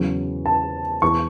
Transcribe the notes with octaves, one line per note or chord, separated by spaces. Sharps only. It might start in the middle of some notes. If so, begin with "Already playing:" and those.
Already playing: E2 C#3 F#3
A5
E2 E3 C#6